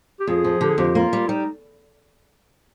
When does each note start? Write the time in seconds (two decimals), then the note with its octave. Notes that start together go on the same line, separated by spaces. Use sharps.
0.20 G4
0.27 F2 G#4
0.44 F3
0.61 D3 G4
0.70 G#4
0.78 F2 G4
0.95 A#3 F4
1.13 G3
1.29 G3 D#4